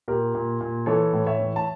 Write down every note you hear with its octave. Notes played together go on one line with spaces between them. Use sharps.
A#2 G4 A#4
A#2
A#2
E3 A4 C#5
A2
C#5 E5
E3
A5